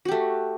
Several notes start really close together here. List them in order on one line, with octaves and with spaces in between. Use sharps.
F#4 G4 A3